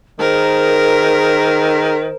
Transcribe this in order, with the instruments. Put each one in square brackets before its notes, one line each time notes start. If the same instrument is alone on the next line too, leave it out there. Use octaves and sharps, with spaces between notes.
[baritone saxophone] D#3 [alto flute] G#4 [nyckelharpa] A#4 [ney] C5